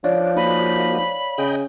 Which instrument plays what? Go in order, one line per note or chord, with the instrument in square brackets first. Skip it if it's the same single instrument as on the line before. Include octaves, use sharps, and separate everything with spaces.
[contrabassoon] F3 [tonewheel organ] D4 [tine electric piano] C#5 D5 F5
[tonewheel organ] A#3 D#4 F#4 [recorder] B5
[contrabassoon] C#3 [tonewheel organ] D#5 G5